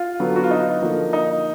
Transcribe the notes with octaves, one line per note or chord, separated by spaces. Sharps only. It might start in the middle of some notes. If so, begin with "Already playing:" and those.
Already playing: F4
D3 F#3 B3
F#4
F4
D#4
D3 F3 A#3
D#4